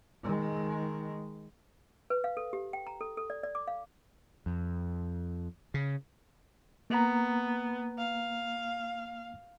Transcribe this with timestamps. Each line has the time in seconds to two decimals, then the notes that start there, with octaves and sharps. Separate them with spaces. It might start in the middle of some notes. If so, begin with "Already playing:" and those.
0.23 D#3 G#3
2.10 B4
2.24 F5
2.37 A4
2.53 G4
2.73 G5
2.87 A#5
3.01 A4
3.17 A4
3.30 D5
3.43 D5
3.55 D6
3.67 F5
4.46 F2
5.74 C#3
6.90 A#3 B3 A#5
7.98 F5